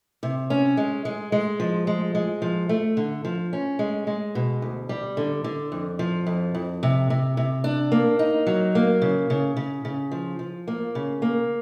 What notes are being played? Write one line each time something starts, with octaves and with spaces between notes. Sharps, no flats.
C3
C#4
G#3
G#3
G#3
F3
G#3
G#3
F3
A3
D3
F3
C#4
G#3
G#3
B2
D2
G3
D3
D3
F2
F3
F2
F2
C3
C3
C3
D4
A#3
D#4
F#3
A#3
C#3
C#3
C#3
C#3
F3
F3
A#3
C#3
A#3